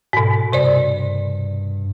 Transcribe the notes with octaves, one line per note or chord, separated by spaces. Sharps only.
G#2 B2
G2 C3 C5 D5